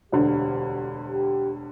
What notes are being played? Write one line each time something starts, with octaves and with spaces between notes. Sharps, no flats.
E1 D2 D3 G4
G4